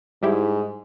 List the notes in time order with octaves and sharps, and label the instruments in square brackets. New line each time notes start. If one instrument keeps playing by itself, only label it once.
[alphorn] G#2 [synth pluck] G3 E4 G4